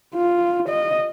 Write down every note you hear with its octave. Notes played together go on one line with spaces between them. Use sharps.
F4
D#5